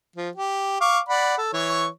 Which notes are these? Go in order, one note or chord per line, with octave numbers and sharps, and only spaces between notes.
F3
G4
F5 C#6 D6
D5 F#5 B5
A4
E3 C#5 C#6